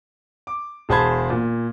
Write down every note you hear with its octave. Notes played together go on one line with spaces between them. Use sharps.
D6
E1 G#4 C5 A5 B5 G#6
A#2